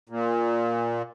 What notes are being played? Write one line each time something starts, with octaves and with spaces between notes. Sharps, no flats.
A#2